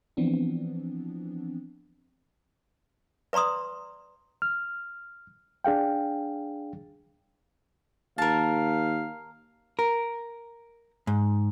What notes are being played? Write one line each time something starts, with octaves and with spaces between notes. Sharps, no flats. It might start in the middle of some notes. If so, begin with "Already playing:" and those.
E3 F3 B3 C4 D4
B4 D5 A#5 C6 D#6
F6
D4 G#4 F5 G5
D#2 A#4 F5 A5
A#4
G#2